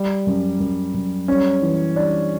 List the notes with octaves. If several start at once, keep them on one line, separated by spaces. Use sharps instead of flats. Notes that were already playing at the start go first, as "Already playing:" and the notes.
Already playing: G3
F#2
F#2
F#2
G3 C#4
E3
G3 D4